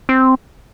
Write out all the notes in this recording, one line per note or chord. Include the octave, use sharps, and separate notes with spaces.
C4